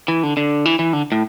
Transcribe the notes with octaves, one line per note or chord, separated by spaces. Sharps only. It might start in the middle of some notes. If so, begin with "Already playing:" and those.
E3
D3
D3
E3
E3
D3
A2